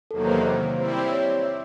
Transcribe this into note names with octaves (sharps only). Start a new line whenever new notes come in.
E2 C3 D#3 F#3 A#3 A4
C5
C5
G3 C4 E4 C5
C#5
D5
E5